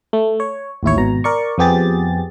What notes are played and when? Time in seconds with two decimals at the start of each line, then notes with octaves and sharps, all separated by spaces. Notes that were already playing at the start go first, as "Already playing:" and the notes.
0.13 A3
0.40 C#5
0.83 A1 D#2 E4 C#5
0.97 G#1 B2 A#5
1.24 A#4 D5 C#6
1.58 F2 F3 B3 G4 G#4 A6